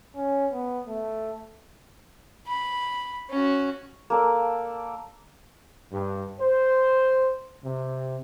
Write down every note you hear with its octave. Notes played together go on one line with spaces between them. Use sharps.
C#4
B3
A3
B5
C#4 F#4
A#3 A4 D5
G2
C5
C3